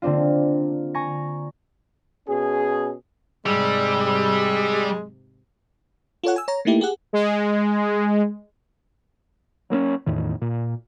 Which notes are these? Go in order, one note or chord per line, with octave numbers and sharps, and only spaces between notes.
D3 A#3 C4 D4 F4
G#5 A#5 C#6 A#6
B2 C#4 G#4
G#2 C3 G3 G#3 E6
F4 A4 C#5 F#5
G#5 E6
C#5 A#5
A3 A#3 D#4 E4 G4 A4
G4 G#4 F#5
G#3
F#3 A#3 C4 C#4
E2 A2 D#3
A#2